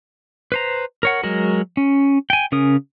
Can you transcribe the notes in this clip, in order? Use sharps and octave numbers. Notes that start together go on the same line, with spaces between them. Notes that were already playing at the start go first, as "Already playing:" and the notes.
B4 C5 A#5
A#4 C#5 F#5
F#3 G#3 F#4 A#4
C#4
G5 G#5
C#3 C#4 A#4 D#6